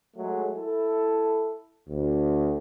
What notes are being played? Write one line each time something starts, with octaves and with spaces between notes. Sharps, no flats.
F#3 G#3 A3
E4 A4
D2